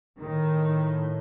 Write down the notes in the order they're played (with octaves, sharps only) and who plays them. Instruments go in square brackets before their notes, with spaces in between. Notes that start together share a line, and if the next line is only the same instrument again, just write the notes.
[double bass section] A2 D#3